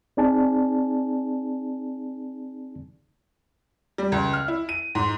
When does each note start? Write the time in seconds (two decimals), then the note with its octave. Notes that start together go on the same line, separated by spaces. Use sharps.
0.17 C4 D#4 G#4 D5 G#5 A5
3.98 G3
4.12 C#2
4.33 F6
4.48 E4
4.69 D#7
4.95 G#2